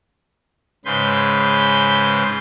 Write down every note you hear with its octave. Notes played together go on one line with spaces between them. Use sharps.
G#2 C#3 B4 C6 G6